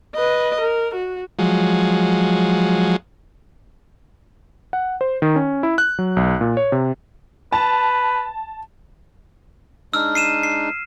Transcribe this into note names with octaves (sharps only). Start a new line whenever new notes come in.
B4 D#5
A#4
F#4
F3 F#3 G#3
F#5
C5
D#3
C#4
E4
F#6
F#3
B1
A#2
C#5
C3
B4 A5
G#3 D4 D#4 E6 F6
C7 D#7 E7
C7